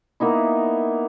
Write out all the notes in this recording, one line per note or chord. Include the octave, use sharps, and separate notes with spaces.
A#3 B3 D#4 E4